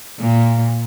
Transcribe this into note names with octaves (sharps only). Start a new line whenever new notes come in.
A#2